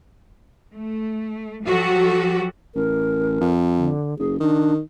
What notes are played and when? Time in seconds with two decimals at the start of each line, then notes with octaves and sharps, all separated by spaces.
0.75 A3
1.65 F3 F#3 F#4 G4 A4
2.75 A1 A#4
3.40 F2
3.78 D3
4.19 F#1 G#4
4.40 D#3 D4